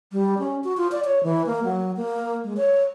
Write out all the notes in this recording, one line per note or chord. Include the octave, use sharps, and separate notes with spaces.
G3
C#4
F#4
F4
D5
C#5
E3
A#3
F#3
A#3
G#3
C#5